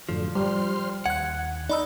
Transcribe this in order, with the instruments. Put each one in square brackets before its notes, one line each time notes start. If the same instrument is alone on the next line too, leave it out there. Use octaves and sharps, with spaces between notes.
[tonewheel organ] F#2 A2 D3 [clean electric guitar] F3
[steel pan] G3 [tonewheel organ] C5 C6 F6
[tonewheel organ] D#2 [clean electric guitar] F#5 [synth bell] F#6 G#6
[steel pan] D#4 [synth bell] D5 B5 E6